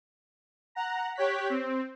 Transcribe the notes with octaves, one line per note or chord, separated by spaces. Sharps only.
F#5 A#5
G4 C#5 F#6 B6
C4